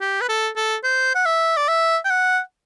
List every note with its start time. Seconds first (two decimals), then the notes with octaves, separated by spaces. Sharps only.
0.01 G4
0.21 B4
0.29 A4
0.56 A4
0.84 C5
1.15 F#5
1.26 E5
1.57 D5
1.68 E5
2.05 G5
2.10 F#5